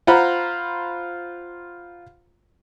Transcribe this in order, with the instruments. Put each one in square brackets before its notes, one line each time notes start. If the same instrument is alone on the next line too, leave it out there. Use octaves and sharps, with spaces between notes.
[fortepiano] F4 C5 F#5 A#5 B5